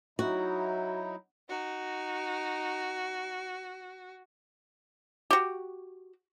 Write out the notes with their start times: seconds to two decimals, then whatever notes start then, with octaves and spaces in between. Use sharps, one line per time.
0.19 F#3 D#4 E4 F#4
1.49 D#4 F#4
5.31 F#4 G4